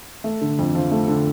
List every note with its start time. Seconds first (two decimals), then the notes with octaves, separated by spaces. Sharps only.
0.24 A3
0.41 D3
0.59 F2
0.75 F3
0.91 A3
1.08 D3